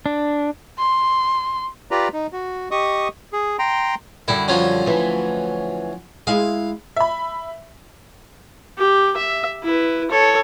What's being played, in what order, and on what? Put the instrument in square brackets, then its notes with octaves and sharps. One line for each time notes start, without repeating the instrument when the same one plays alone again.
[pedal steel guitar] D4
[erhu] C6
[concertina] F4 G4 B4 D5 A#5
D#4
F#4
G4 D#5 C#6 D#6
G#4
G5 A#5 C6
[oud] F#2 D3 G3 [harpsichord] E4
[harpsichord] F3 F#3 C#4
[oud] D2 E3
[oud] G#3 E4 [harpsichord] F5
[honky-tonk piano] E5 B5
[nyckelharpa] G4
E5
E4 B4
A4 C#5